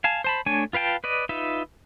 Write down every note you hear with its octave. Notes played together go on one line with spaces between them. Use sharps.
F5 G#5 A5
C5 A5 B5
A3 D4 C#5 G#5
F4 B4 F5 G5 A5
B4 D5 D#5
D#4 F4 B4 E5